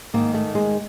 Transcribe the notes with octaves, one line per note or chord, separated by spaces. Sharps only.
G#2 D#3 A#3
A3
G#3